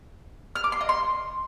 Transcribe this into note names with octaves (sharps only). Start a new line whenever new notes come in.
F6
D6
C6
D#5
C6